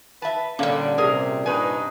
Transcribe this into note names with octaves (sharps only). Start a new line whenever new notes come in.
B4 E5 A5
A#2 D3 G3 A#3 C#4
C3 G#4 A#4
G2 C3 D#4 B4 G#5